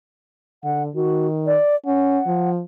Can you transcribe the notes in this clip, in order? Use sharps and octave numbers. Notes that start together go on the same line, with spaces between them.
D3 F#5
D#3 F#4
D5
C#4 F#5
F3